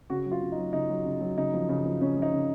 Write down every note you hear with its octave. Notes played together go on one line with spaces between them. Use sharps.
C#3 F#4
F#3
F4
C#3
D#4
F#3
C#3 D#4
F#3
C#3
F#3
C#3 D#4
F3
C#3
F3
C#3 C#4
F3
D#4
C#3